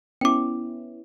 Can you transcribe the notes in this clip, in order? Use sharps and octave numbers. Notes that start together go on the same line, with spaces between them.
B3 C#4 E4 G5 D6